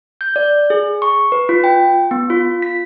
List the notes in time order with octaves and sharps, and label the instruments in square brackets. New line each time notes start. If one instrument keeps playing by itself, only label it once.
[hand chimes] G6
D5
G#4
C#6
B4
F4
G5
B3
F4
B6